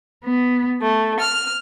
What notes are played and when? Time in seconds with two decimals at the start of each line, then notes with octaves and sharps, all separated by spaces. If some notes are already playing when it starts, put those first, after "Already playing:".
0.24 B3
0.82 A3
1.19 F6